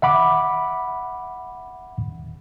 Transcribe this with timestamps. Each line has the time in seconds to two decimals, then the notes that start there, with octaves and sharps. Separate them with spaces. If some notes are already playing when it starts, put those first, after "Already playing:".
0.02 E5 F#5 B5 D6